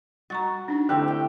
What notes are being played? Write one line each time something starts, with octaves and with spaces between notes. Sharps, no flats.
G3 F#4 A#5 C#6 A6
D4 D#4
D3 A3 C4 E4 G4
G5